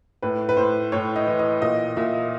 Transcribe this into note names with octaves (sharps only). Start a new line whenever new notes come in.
A2 B4
B4
A2 C5
A2 C#5
D#5
E3
D#5
A#2 D#5
A#2 E5